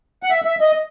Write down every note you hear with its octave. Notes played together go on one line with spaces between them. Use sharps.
F#5
E5
E5
D#5